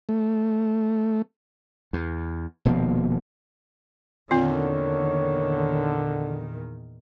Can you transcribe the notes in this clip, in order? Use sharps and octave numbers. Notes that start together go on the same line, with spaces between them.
A3
E2
D#1 B2 F3 A#3
E2 A#2 D3 D#3 C4 F4 C#5